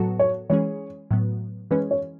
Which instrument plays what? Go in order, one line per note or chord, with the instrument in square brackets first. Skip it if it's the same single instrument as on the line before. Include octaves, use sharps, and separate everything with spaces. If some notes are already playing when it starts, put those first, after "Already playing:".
Already playing: [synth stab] A2 F#3 B3 F#4 A4
[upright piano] C#5
[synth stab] E3 G#3 C#4 G#4 [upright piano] C#5
[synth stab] A2 F#3 B3
[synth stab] E3 G#3 C#4 [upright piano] B4
[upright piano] C#5